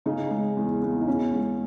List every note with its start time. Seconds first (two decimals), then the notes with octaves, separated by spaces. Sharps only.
0.06 C#3 D#4
0.31 G#3
0.57 E2
0.82 E2
1.01 D#4
1.07 B2 C#4
1.33 G#3